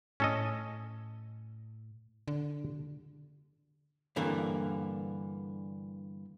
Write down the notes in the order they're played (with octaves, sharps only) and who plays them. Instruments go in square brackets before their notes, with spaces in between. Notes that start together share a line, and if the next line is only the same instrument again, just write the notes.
[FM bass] A2 [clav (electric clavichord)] C#4 A4 D#5
[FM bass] D3
[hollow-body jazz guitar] G2 D3 E3 A#3